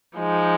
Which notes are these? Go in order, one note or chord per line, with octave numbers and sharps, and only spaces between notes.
F3 G#3 D#4